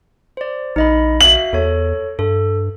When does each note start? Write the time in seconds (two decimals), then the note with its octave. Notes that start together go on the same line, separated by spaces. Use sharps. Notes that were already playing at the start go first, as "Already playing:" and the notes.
0.37 C5 D5
0.76 A#1 D#4 D#5 B5
1.21 F#4 E5 F5 F#7
1.53 E2 A4 C#5
2.19 G2 A4